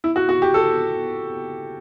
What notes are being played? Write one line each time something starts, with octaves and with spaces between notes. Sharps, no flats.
E4
F#4
F#4
G4
A4